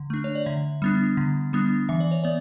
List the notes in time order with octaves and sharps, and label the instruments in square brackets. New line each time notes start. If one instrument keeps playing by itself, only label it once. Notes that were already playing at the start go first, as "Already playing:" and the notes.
Already playing: [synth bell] D3
A3 D4
C#5
D5
D3 E5
G3 B3 D4
D3
G3 B3 D4
E3 E5
D5
C#5
B3 D5